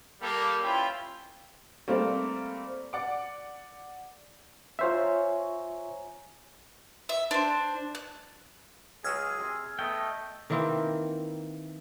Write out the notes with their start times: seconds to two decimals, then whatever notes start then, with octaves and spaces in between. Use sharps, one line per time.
0.21 G3 A#3 A4
0.62 C#4 E4 F4 B4 G5 B5
1.88 G3 A3 A#3 C4
2.93 D5 F#5 D6
4.79 F4 C5 C#5 E5 G#5 A#5
7.09 E5
7.31 D4 C5
7.95 F#6
9.04 C#2 F#3 G#3 G#4 E6 F6 G#6
9.40 C3
9.79 A3 B3 D#5 G5
10.50 D#3 E3 A#3 C4